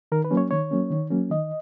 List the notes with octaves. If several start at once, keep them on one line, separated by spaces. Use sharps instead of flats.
D#3 A#4
B4
F#3 A#3 C#4
C#5
D#3 C#5
F#3 A#3 C#4
D#3
F#3 A#3 C#4
D#3 D#5